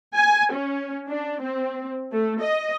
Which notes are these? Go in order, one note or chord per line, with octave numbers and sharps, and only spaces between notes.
G#5
C#4
D4
C4
A3
D#5